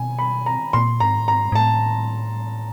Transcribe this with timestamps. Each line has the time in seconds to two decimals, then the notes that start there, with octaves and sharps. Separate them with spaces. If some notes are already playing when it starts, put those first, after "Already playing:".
Already playing: B2 G#5
0.19 B5
0.46 A#5
0.73 A#2 C6
1.00 G#2 A#5
1.19 A2
1.28 G#2 A#5
1.52 G#2
1.55 A2 A5